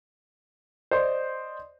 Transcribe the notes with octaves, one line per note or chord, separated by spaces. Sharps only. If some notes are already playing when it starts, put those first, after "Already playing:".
C5 D5 D#5 C6